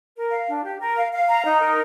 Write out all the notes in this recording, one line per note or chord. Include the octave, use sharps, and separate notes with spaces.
A#4
F5
D4
G4
A#4
F5
F5
A#5
D#4
A#4